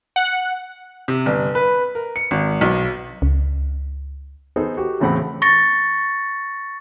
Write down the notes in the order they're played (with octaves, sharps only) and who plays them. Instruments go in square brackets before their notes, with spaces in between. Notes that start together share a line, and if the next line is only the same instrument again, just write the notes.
[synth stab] F#5
[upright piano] C3
G1
B4
A#4
C#7
G#1
B1
[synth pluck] C#2
[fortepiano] B3 D#4 G#4 A4 C5
F#4 G4
E2 A2 C#3 C4 F#5 B5
[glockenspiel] C#6 A6 A#6 C#7